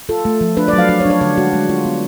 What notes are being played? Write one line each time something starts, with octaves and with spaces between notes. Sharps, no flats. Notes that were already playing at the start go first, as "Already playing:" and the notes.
F4 A4
A3
F3
D4 B4
D5
F#3
F5
D4 D5
C#5
D4
C#5
D3 C#5
G#3 F#4
G#3
F4
B3